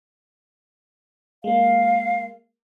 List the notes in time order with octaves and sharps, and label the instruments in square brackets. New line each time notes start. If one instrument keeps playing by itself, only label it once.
[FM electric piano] G#3 A#3 [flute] F5